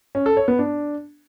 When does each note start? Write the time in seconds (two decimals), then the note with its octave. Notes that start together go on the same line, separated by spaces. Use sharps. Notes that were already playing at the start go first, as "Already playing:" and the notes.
0.15 C#4
0.26 A4
0.37 C#5
0.48 B3
0.59 D4